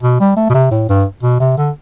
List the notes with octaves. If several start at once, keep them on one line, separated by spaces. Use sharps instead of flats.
B2
G3
A3
B2
C3
A2
G2
B2
C3
D3